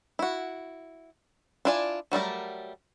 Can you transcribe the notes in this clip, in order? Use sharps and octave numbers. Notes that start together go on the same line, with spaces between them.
E4 F#4
D4 E4 F4 D5 G#5
F#3 G3 A3 A#4